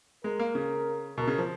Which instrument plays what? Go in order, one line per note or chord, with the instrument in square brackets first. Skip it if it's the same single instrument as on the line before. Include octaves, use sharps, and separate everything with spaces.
[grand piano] G#3 [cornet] A#4
[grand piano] A#3
C#3
[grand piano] B2 [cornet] A#4
[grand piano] C#3
F3